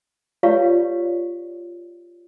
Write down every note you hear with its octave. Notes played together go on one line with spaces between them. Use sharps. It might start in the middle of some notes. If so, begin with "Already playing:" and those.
F4 G4 B4 C#5 D5 F5